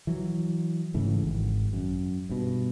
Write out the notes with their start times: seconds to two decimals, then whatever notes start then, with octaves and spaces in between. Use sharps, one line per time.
0.07 E3 F#3
0.94 G#2 C#3 E3 A3
1.24 G#1
1.73 F#2
2.30 G2 B2